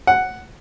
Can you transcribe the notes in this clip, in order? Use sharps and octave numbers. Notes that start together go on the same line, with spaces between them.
F#5